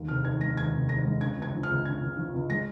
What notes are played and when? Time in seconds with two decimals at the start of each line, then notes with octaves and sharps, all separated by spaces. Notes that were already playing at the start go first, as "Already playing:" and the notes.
Already playing: D#2 A#3
0.08 F1 F6
0.25 D#3 G#6
0.41 G#3 A#6
0.57 D#2 G#6
0.73 F1
0.89 D#3 A#6
1.05 G#3
1.20 C#3 G#6
1.37 C#2 G#6
1.53 F3
1.63 F6
1.69 C#2
1.85 C#3 G#6
2.02 C#2
2.17 F3
2.34 C#2
2.50 G#3 A#6